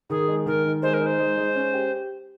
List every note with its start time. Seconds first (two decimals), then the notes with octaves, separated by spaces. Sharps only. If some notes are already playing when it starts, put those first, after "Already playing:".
0.10 D#3 G#4
0.28 G#3
0.46 D#3 A#4
0.65 D#3
0.82 G#3 C5
0.94 A#4
1.01 D#4
1.06 C5
1.19 G#3
1.37 G#3
1.56 C#4
1.74 G4